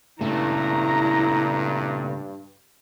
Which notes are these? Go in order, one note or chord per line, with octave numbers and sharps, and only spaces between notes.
G2 A#2 C#3 A3 E4 A#5